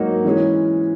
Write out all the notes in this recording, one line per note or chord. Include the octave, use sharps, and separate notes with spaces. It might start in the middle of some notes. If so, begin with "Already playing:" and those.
Already playing: G#2 F#3 A#3 D#4 F#4
E3 G#3 C#4 G#4